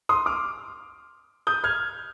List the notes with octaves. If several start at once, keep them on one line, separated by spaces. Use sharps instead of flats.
C6 D#6
D6 F6
D#6 G6
F6 G#6